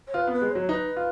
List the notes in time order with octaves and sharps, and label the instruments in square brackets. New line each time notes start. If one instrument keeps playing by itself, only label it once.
[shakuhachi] C#5
[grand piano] F4 [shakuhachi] B4
[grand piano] B3
[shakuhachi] B4
[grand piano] G#3
[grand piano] F#3 [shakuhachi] C#5
[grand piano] D#4 [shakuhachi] B4
[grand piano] F4